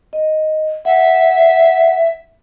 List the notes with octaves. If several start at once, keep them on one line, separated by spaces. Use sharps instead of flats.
D#5
E5 F#5